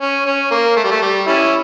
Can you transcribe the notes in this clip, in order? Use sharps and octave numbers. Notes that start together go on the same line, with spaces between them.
C#4
C#4
A#3
A3
G3
A3
G3
C#4 E4